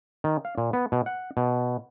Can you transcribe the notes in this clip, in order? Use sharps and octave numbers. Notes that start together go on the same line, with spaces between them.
D#3
F5
A#2
B3
B2
F#5
B2